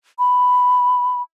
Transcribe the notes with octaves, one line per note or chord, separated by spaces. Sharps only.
B5